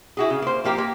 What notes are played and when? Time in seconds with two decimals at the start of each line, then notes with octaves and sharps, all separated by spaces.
0.17 E4 F#4 G#4
0.30 C#3
0.42 A#3 C5
0.64 F3 A#3 G4 A#4
0.78 A#3